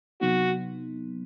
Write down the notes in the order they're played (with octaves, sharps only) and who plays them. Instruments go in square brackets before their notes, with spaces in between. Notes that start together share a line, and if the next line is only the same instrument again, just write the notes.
[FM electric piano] C3 F#3 B3 D#4 [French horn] F#4